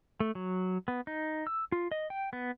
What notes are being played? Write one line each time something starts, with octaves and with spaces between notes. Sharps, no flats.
A3
F#3
B3
D#4
E6
F4
D#5
G5
B3